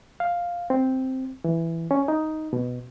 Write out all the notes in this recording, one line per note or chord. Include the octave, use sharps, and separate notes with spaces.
F5
C4
E3
C#4
D#4
B2